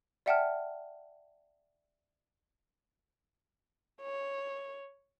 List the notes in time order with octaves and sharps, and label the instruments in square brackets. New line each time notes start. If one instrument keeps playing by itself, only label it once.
[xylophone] D5 E5 F#5 G5 A5 F6
[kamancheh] C#5